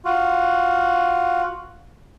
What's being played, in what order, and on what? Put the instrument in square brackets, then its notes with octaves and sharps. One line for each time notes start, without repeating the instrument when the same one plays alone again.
[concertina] F4 F#4